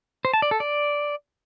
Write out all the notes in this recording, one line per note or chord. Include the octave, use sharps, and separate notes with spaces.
C5
A5
D5
A4
D5